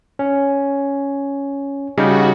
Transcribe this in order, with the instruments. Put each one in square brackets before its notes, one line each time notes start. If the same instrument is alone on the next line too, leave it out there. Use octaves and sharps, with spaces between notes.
[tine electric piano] C#4
[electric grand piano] C#3 G3 D#4 [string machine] F#4